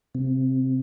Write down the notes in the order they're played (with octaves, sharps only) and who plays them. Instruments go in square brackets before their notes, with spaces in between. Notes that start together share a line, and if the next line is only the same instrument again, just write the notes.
[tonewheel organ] C3